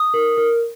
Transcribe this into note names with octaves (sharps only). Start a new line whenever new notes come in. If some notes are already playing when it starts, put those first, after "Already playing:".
Already playing: D#6
A#4
A#4